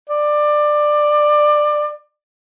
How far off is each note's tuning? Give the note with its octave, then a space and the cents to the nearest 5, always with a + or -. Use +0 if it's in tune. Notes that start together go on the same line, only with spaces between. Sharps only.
D5 +20